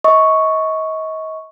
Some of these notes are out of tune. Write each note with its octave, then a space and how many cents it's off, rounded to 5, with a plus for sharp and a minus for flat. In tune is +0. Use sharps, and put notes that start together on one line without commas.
D#5 +35 C#6 +0